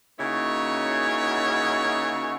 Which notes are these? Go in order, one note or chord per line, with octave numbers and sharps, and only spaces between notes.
C#3 A#3 D#4 E4 F#4 C#5